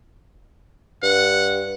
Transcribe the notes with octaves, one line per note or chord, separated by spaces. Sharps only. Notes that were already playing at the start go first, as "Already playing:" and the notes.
G2 F#5